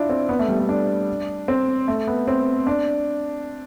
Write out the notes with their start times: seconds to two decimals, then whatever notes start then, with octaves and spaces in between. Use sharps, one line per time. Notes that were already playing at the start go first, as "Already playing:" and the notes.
Already playing: D4 E4 F4
0.09 C4
0.29 B3
0.39 A3
0.49 G3
0.59 A3
0.69 D4
1.48 C4
1.88 A3
2.07 B3
2.28 C4
2.67 D4